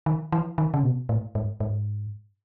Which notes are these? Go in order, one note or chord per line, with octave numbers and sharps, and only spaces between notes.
D#3
E3
D#3
C#3
B2
A2
G#2
G#2